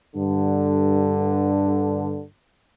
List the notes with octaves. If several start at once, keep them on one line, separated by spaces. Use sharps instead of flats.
G2 D3